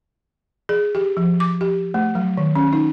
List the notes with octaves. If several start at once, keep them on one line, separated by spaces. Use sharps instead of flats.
G#4
G4
F3
D6
G4
A3
F#3
D#3
C#4
D#4